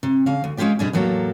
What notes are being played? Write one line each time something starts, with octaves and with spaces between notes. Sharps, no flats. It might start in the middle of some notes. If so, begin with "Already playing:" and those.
C3
C#3 F5
D2
G#3 C#4 D#4 F4 G4 D5
B2 G3 D4 G#4
E2 A2 F#3 A#3 A4